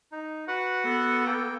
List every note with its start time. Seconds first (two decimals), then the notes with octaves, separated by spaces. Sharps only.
0.12 D#4
0.48 F#4 B4 F#5
0.84 B3 A4
1.26 A#3 G5